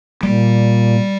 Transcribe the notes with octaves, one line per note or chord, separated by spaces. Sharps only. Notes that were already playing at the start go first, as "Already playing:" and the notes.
A#2 G3